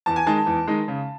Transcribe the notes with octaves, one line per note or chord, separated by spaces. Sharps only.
E2 A5
G#5
D#3 G#3 D#4 A5
E2
D#3 G#3 D#4
C#3